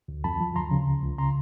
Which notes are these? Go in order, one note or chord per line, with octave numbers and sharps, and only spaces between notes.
D2
F2 A5 B5
F3
D2 A#5 C6
C#3
C#2
C#2
C#3 A#5 C6